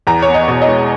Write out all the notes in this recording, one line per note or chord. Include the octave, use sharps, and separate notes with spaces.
E2 A#5
C#5
B3
D#5
B2
D#5
G#3